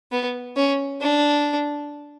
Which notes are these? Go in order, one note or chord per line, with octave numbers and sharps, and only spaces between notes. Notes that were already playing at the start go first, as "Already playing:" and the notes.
B3
C#4
D4